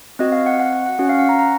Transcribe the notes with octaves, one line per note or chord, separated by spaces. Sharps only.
C4 F#4 D#5
F5
F#5
F#5
F#5
F#5
C#4 F#4
F5
F#5
A#5
A#5